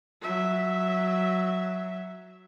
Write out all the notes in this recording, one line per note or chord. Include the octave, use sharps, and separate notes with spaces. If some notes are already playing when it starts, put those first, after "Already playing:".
F#3 E5